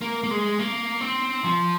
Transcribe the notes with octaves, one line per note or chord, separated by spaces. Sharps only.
A#3
A#3
G#3
A#3
C4
F3